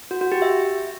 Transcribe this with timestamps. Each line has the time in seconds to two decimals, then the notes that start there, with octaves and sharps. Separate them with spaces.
0.11 F#4
0.21 F#4
0.32 G4
0.42 E5